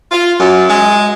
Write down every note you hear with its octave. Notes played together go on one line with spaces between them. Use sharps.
F4
F#2
G#3